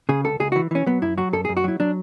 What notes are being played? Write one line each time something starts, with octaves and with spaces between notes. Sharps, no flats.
C#3 G#4
C#2 A4
C#2 G#4
F#4
E3
E3 C#4
F#3 B3
F#2 E4
F#3 F#4
F#2 A4
G#4
F#2
F#4
F#3 E4
F#3 D4